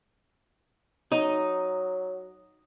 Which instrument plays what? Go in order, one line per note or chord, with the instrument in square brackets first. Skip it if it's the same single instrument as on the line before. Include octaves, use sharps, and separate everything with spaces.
[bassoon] F#3 [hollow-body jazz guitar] D#4